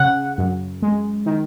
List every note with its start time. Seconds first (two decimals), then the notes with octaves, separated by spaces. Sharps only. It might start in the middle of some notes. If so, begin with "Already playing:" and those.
Already playing: C#3 F#5
0.38 F#2
0.82 G#3
1.26 D#3